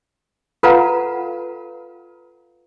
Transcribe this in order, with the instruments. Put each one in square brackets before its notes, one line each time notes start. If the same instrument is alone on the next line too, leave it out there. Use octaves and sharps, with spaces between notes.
[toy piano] F4 A4 B4 F5 F#5 A#5